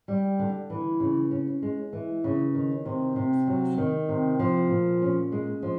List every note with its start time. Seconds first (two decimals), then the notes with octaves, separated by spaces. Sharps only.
0.08 G3
0.39 D3
0.70 E3
1.00 C#3
1.31 C#4
1.62 G#3
1.93 E3
2.24 C#3
2.54 D#3
2.85 C3
3.16 C3
3.47 F#3
3.78 D#3
4.09 C3
4.39 F3
4.70 A#2
5.02 C#4
5.32 G#3
5.63 F3